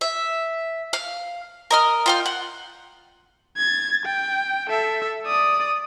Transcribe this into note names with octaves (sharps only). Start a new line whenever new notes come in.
E5
F5
A#4 D#5 F6
F4 G5 F6
F#5
G#6 A6
G5
A4 E5
D5 D#6